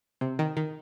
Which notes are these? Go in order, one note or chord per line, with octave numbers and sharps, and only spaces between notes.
C3
D#3
D#3